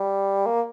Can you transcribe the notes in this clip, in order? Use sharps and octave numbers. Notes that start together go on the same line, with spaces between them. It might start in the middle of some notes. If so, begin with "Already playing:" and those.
Already playing: G3
A#3